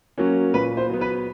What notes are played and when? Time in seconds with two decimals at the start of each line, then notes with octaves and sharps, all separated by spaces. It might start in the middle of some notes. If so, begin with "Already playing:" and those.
0.18 F#3 A#3 C#4
0.54 A#2 B4
0.77 C5
0.90 F#3 B3
1.01 B4